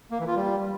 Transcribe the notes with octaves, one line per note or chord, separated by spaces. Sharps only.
A#3
E3
F4
G3